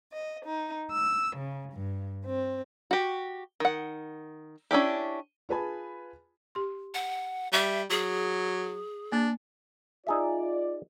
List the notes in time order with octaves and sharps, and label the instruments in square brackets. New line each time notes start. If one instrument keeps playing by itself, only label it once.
[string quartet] D#5
D#4
E6
C#3
G2
C4
[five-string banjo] F#4 G4
D#3 F#5
C#4 D4 E4 G4
[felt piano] F4 G#4 B4 G#5 A5 B5
[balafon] G4 C6
[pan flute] F#5
[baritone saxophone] G3 [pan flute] E5
[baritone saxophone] F#3 [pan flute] G#4
[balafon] A#3 [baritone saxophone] D4
[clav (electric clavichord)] D#4 G#4 E5 [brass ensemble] F4 D5